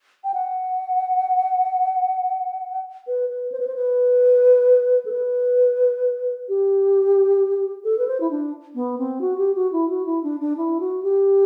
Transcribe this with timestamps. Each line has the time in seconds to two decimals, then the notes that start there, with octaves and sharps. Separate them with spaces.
0.24 G5
0.34 F#5
3.07 B4
3.30 B4
3.52 C5
3.60 B4
3.67 C5
3.76 B4
5.05 A4
5.12 B4
6.48 G4
7.84 A4
7.98 B4
8.08 C5
8.20 E4
8.31 D4
8.75 B3
8.98 C4
9.21 F#4
9.38 G4
9.55 F#4
9.72 E4
9.89 F#4
10.06 E4
10.23 D4
10.40 D4
10.57 E4
10.80 F#4
11.03 G4